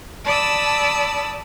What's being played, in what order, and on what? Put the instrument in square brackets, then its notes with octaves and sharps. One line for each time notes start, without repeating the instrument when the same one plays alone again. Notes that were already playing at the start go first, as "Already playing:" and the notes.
[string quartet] D5 A5 B5 D#6 E6